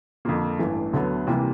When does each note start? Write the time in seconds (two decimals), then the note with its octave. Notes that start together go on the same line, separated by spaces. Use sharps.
0.25 F2 D3 F3 A#3
0.59 A1 G2 E3 A3
0.93 D2 D3 F#3 B3
1.27 C3 E3 G3 A#3